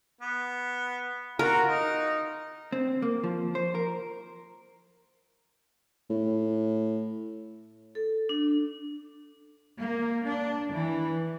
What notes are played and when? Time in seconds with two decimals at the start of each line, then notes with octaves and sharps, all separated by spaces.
0.21 B3
1.39 F4 F#4 A#4
1.68 D#4
2.72 C4
3.02 A#3
3.24 F3
3.55 C5
3.75 A#4
6.10 A2
7.95 A4
8.29 D4
9.79 A#3
10.27 D4
10.71 E3